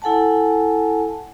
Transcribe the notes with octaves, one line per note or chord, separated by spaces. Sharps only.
E4 A4 F#5 G#5 A5